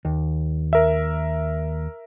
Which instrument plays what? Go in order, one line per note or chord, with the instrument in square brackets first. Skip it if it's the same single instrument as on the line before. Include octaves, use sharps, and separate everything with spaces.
[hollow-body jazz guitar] D#2
[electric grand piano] A#4 E5